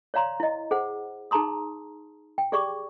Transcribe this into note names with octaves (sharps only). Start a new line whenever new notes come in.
C#5 D5 F5 A#5 C6
E4 D#5
G#4 C5 F#5
D#4 G#4 A5 A#5 C6 D#6
G5
G4 G#4 D5 C#6 D6